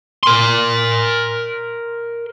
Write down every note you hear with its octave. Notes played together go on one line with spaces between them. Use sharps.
A#4 C6